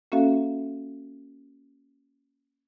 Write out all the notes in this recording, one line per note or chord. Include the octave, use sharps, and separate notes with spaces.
A#3 C#4 F#4 A4 E5 F5